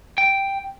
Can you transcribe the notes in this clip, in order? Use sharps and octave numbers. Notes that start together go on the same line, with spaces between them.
G5